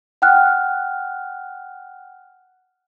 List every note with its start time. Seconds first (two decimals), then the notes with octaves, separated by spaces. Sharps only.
0.22 F#5 G5 F6 F#6